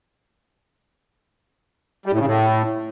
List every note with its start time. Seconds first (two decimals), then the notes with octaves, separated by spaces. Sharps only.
2.06 G3
2.12 A2
2.19 C#3
2.26 A2